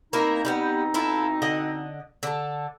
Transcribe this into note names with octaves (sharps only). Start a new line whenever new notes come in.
B2 A#3 C4 D#4 E4 A#4
G3 A#3 B3
E4 F4 A4
D3 D#5 F#5
D3 A4